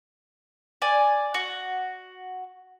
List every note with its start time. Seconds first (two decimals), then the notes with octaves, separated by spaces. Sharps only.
0.82 D5 G#5
1.34 F#4